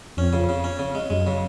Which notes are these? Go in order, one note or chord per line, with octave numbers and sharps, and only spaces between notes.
F2 C#4
C#3
C#3
C#4
C#3
G#3
F#2 G#3
C#3